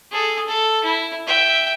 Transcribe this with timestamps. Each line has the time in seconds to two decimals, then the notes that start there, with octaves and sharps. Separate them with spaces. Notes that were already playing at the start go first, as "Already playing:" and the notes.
0.12 G#4 A4
0.48 A4
0.84 E4
1.27 E5 G5